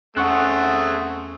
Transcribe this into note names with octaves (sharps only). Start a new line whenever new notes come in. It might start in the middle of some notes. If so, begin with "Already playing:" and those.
E2 A3 C4 C#4 G#4 F#5 C#6 F#6